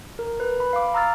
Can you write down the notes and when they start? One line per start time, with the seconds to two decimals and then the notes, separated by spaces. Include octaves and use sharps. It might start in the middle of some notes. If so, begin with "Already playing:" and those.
0.19 A#4
0.40 B4
0.60 B5
0.73 F5 D6
0.94 A#5 D6 E6 F6 A6